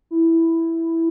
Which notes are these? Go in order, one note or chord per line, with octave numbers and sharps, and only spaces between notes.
E4